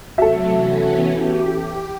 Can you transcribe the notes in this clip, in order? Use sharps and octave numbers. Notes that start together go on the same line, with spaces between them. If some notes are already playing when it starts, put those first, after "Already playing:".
C3 F#3 A3 F#4 A4 E5
E3 B3 C#4
G4